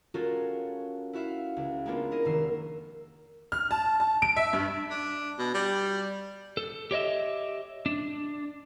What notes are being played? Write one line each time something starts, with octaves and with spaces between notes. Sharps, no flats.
G#3 C#4 F4 F#4 A4 A#4
E4 F#4 E5 F5
C#2
G#3 A#3 B3 D4 F4
E4 A#4 D#5
F1 D#3 E6 C7
F6
A5
A5
D7
E5
G2
D4
B2
G3
A4
G4 C#5 D#5 E5
D4